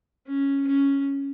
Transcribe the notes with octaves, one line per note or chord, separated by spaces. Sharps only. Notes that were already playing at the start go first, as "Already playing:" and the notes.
C#4
C#4